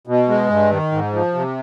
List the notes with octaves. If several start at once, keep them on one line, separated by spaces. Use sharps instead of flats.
B2
G#3
G2
D#3
G#2
F3
C3